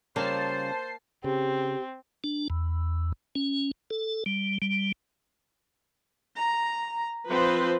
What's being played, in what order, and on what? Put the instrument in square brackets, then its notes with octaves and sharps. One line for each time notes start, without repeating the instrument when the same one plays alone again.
[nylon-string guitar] C#3 G3 F4 [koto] A#3 [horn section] C5 [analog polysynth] A5 C7
[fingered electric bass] C#3 [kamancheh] C4 [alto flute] G4
[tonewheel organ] D4
E2
C#4
A4
G3
G3
[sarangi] A#5
[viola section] F3 B4 C5 [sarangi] C4